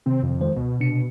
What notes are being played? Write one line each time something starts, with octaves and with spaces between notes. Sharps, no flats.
C3 D#3 C4
F2
D#3 G#3 C5
C#2 B2
C3 D4 C#7